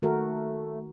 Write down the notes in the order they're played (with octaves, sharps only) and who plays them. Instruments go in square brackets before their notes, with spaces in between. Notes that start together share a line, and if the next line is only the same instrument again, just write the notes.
[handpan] D#3 F#4 A#4 [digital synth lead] A3